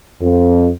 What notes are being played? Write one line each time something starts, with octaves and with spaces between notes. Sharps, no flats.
F2